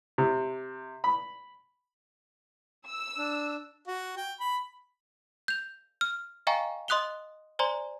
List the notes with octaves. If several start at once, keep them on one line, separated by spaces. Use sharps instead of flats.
C3
B5
E6
D4
F#4
G5
B5
G6 F7
F6
D#5 F5 G5 G#5 A#5 C#6
D#5 C6 D#6 F#6 F7 G7
C5 D5 G#5 A#5 C6